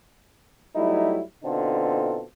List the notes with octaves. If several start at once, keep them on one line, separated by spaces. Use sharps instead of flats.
F#3 G3 A3 D#4 E4
B2 D3 C4 D#4 F4 A4